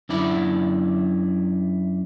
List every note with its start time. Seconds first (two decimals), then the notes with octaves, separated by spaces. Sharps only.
0.09 F#2 D4 E4 D5 B5